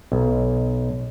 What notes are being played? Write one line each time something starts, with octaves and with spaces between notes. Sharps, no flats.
B1